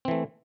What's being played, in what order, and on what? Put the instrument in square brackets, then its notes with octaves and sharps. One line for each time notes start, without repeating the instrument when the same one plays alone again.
[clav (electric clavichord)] C4
E3
A3